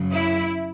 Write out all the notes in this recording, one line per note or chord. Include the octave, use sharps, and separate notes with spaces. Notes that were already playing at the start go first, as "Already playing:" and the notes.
Already playing: F#2 C#3 F#3
E4